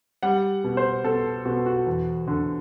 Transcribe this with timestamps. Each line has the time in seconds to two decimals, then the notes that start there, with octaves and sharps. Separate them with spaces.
0.23 G3 F#5
0.64 B2
0.77 C5
1.04 B2 A4
1.45 B2 F#4
1.66 F#4
1.87 E2
2.28 D3